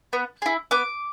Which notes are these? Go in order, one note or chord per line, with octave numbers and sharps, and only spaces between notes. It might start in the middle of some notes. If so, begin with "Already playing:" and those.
B3
E4 G#4
B3 D6